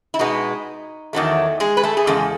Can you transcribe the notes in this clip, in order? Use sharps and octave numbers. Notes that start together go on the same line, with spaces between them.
E4
B2 G#3 B3 D#4
E2 D#3 F#3 A3
G#3 G#4
B4
A3 A4
G#4
E2 C#3 G#3 A4